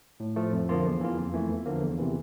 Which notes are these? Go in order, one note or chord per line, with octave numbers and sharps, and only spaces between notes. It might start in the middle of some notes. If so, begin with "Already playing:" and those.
A2
F3 A3
F2
D3 F3 A#3 F4
E2
E3 A#3 F4
F2
E3 A3
E2
D3 F3 A#3
E2
C3 E3